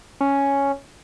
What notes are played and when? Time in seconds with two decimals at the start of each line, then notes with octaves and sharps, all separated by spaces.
0.21 C#4